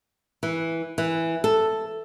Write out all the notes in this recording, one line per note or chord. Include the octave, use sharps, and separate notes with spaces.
E3
E3
A4